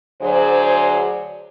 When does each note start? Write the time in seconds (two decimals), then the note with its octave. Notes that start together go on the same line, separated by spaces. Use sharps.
0.21 D2 F#3 G#4 C5 D5